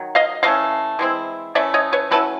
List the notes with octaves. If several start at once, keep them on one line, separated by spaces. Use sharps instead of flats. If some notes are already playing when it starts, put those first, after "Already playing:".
Already playing: D#3 F#3
D#5 F5
E3 A3 C#4 D#5 F5
E3 G#3 C4 E4
E3 A3 C#4 D5 E5
C#5 D#5
B4 C#5
F#3 A3 C#4 E4 A4 B4